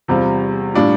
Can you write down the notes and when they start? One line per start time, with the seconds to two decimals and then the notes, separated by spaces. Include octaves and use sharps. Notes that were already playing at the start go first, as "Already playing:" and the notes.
0.08 E2 C3 G3 C4 F4
0.74 A2 G3 D4 F4